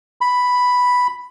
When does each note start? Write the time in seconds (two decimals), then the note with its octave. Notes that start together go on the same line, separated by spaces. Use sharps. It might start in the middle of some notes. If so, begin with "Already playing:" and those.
0.21 B5